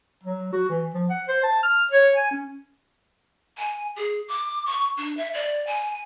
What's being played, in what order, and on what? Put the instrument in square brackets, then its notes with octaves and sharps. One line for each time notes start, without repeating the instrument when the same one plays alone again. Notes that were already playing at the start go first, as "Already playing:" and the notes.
[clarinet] F#3
F#4
E3
F3
F#5
C5
A5
F6
C#5
G#5
C#4
[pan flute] G#5
G#4
D6
C#6
D4
E5
D5
G#5